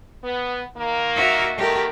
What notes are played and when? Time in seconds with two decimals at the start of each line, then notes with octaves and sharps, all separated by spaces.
0.23 B3
0.77 D#3 A#3
1.15 F#4 E5
1.58 B2 D#3 A3 G4 A#4